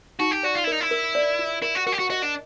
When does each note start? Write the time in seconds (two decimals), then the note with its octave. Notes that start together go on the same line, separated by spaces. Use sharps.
0.19 D#4 F#4
0.31 G4
0.43 F#4 D5
0.55 F4
0.64 E4
0.67 D#4 A#4
0.81 E4
0.91 A#4
1.15 D5
1.39 F4
1.62 E4 A#4
1.75 F#4
1.86 F#4 A#4
1.92 G4
1.99 F#4
2.10 F#4 D#5
2.22 D4